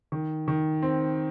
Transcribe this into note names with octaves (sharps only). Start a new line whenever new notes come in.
D#3
D#3
C4